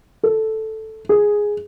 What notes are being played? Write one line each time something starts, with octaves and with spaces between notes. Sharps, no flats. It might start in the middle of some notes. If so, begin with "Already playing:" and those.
A4
G#4